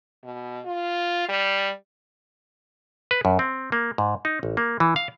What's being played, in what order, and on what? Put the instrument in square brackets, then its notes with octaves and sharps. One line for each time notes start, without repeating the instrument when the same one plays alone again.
[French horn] B2
F4
G3
[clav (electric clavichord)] B4
F#2
C4
A#3
G#2
D#4
A1
A#3
E3
F5